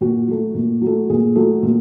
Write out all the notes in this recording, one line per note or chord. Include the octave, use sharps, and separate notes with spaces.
A#2 F#4
F#3 A3
A#2
F#3 A3
A#2 G#4
F#3 A3
A#2